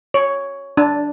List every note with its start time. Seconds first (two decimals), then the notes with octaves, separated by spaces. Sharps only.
0.14 C#5
0.77 D4